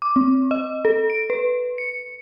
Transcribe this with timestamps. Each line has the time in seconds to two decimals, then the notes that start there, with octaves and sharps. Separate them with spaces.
0.02 D6
0.16 C4
0.51 D#5
0.85 A4
1.10 D7
1.30 B4
1.78 C#7